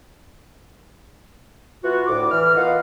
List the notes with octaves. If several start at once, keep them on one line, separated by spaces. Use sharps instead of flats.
E3 B3 F4 F#4
D2 A2 D6
E3 F6
A#3 B3 F4 D#5 F5 F#5